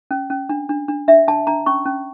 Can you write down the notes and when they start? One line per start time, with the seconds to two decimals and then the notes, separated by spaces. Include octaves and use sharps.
0.11 C#4
0.30 C#4
0.49 D4
0.69 D4
0.88 D4
1.08 D4 E5
1.27 D4 A5
1.47 D4 A#5
1.66 C#4 C#6
1.85 C#4